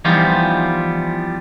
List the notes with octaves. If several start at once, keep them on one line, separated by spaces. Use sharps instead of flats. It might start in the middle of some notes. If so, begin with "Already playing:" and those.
E3 F3 G3 B3 D#4 F4